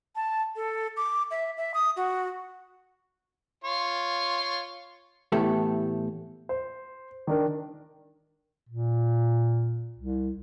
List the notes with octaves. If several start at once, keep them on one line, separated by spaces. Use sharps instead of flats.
A5
A4
D6
E5
E5
D#6
F#4
F4 C#5
A2 E3 A3 B3 G4 A4
C5
D#3 D4 A#4
A#2
C2